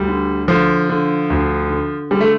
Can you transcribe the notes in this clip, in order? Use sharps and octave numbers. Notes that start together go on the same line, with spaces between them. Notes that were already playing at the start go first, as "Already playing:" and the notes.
Already playing: D2 G3
D3
D3 F3
D3
D2
D3
D3 G3
A3